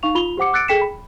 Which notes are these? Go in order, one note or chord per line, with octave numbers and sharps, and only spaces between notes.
D#4 F5 C#6 F7
F4 B5 F7 G7
G4 C5 F#5 D6 C#7
D6 E6 F#6 A6 C#7 D7
G#4 A4 G5 B6 C#7 E7
B5